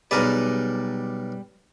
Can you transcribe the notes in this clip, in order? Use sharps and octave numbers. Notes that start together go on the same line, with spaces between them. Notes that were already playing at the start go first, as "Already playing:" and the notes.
B1 G3 G#4 A#4 B4 D5